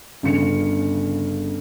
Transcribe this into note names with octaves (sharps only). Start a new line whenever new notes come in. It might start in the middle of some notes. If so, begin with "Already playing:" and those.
G1 C#3 C#7